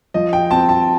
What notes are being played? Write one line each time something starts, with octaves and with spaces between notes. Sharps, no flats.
F3 D#5
G5
C4 A5
A5